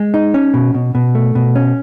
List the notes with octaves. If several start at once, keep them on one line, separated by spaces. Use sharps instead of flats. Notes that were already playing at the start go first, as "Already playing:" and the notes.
Already playing: G#3
D#4
C#4
B2
B2
B2
A3
B2
C#4